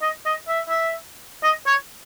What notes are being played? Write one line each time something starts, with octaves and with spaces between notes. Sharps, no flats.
D#5
D#5
E5
E5
D#5
C#5